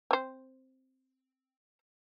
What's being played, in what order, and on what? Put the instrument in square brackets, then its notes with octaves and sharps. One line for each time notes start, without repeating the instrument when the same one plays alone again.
[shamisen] C4 C5